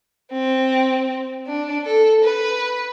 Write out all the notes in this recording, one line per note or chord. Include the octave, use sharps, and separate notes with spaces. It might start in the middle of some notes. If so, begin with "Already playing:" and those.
C4
D4
A4
B4